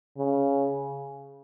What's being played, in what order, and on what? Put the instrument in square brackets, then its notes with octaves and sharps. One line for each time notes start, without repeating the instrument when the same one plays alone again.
[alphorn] C#3